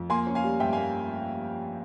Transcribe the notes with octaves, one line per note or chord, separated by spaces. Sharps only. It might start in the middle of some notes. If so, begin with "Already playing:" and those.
Already playing: F2
A#3 G#5 C6
C#4
F5 G#5
G3
G2 E5 G5
F5 G#5
A#3